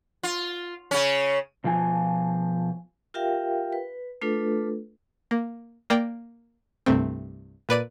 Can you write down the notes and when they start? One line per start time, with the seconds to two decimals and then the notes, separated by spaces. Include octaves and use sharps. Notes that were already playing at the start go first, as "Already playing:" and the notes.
0.23 F4
0.91 C#3 C#4
1.64 B2 F3 F4 G#5
3.14 F4 G4 A#4 E5 F5 G5
3.73 B4
4.22 A3 D4 F4 A4 B4
5.31 A#3
5.90 A#3 A#4 D5 G5
6.86 C2 G2 C3 A3 C4
7.69 A#2 B4 D5 D#7